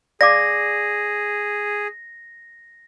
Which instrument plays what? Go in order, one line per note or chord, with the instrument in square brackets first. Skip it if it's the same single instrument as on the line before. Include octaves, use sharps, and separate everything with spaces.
[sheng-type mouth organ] G#4 [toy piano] D5 F5 D6 [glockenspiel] A#6